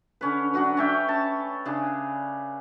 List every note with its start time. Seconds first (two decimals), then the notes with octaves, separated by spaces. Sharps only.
0.21 D3 C#4 B4
0.54 F#3 D4 F#4 B4
0.77 C#4 E5 G5
1.08 A5
1.65 C#3 D4 G#4